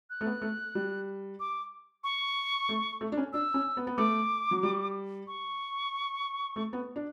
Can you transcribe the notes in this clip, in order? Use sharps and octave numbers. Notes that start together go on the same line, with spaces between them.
F#6
A3
B3
A3
G3
D6
C#6
A3
A3
D4
C#4
D4 E6
C#4
B3
B3
A3 D6
F#3
G3
C#6
A3
B3
D4